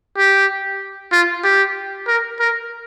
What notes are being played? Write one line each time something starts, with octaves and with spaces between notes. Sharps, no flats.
G4
F4
G4
A#4
A#4